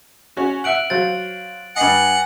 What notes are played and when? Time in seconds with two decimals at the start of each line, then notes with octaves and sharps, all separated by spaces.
0.37 C#4 F#4
0.64 E5 F#5 F#6 D7 F#7
0.90 F#3 F4 C5 A6
1.76 G2 D#5 F#5 G#5 C7